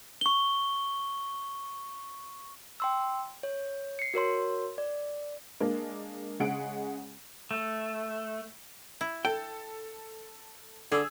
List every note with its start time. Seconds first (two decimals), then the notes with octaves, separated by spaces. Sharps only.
0.21 C#6 G7
2.80 G5 C6 E6
3.43 C#5
3.99 C7 C#7
4.14 F#4 A#4 C#5 C6
4.78 D5
5.60 G#3 A#3 D4
6.40 C#3 G#3 G#4 F#5 D7
7.51 A3
9.01 E4
9.25 A4 G5
10.92 D3 G#4 E6